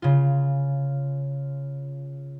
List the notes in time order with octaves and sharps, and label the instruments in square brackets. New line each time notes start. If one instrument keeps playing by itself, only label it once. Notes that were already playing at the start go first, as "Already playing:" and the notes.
[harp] C#3 F4